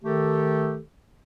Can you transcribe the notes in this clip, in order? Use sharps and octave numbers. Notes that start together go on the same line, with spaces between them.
D#3 A3 G4 A4